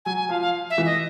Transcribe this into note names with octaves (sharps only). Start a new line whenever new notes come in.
F#3 G#5
G#5
F3 F5
F5
E5
E3
D#5